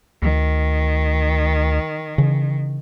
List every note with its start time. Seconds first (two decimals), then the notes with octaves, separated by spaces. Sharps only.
0.22 D2 D#3
2.18 C#3 E3